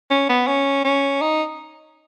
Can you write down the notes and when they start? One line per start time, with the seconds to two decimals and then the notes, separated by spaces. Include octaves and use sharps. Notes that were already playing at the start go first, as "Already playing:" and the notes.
0.11 C#4
0.29 B3
0.48 C#4
0.85 C#4
1.22 D#4